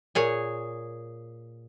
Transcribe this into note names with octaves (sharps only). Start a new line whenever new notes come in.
A#2 G#4 C#5